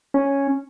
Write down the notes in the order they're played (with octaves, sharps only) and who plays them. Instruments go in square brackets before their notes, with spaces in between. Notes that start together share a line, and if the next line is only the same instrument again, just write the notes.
[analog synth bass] C#4